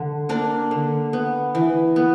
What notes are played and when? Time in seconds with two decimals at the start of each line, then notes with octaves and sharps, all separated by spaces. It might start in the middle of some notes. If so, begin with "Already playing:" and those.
Already playing: D3
0.29 A#3 D4
0.71 D3
1.13 B3
1.55 E3
1.96 B3